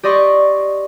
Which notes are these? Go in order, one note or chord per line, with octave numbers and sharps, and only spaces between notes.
G4 D5 D#5 C6 C#6